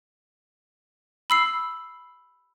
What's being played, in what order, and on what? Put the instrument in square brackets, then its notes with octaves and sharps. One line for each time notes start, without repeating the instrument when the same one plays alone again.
[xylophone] B5 E6 C7